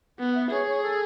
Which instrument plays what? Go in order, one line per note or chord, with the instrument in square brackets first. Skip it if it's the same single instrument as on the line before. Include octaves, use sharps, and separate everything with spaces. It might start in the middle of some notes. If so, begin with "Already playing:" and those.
[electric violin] B3 [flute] F#5
[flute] E5
[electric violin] G#4 [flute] C#5
[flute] C#5
A4